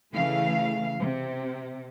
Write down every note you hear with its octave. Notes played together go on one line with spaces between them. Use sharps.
C#3 E3 A3 F5
C3